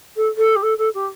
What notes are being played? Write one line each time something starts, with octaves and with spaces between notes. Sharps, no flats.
A4
A4
G4
A4
A4
G4